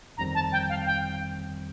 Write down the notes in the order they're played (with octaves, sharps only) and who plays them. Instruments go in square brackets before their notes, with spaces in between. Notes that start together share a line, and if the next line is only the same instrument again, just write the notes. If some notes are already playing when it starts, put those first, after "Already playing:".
[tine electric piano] G1 F2 D#3 G3 C4 [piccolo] A#5
[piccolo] A5
G5
F5
G5